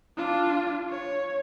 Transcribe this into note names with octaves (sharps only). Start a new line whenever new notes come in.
D4 F4
C#5